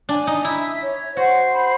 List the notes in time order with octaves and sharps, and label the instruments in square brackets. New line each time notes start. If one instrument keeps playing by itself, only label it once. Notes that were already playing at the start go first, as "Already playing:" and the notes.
[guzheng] D4 [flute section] G#5
[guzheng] D#4
[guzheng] E4 [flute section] E5
[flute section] C#5
[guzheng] F#4 [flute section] C5
[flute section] B5